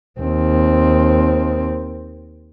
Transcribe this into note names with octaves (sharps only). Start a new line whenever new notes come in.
D#2 C4